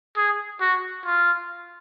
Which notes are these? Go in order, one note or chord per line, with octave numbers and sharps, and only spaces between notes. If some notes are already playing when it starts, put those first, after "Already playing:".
G#4
F#4
F4